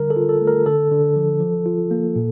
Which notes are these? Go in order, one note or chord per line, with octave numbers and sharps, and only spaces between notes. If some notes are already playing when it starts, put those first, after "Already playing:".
Already playing: D3 G3 A#4
A4
F4
A4
A3
A#4
D3 A4
D3
F3
F3
F4
A#3
A#2